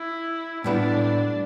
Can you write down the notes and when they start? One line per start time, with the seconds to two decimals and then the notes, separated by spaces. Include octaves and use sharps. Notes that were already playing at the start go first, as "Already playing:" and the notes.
Already playing: E4
0.64 A2 G3 B3 D4 E4